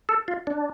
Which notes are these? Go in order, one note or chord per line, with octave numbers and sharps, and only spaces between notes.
A4
F4
D4